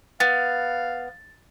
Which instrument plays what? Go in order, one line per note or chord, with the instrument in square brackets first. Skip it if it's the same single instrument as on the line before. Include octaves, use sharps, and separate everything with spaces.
[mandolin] B3 [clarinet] F5 [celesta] A6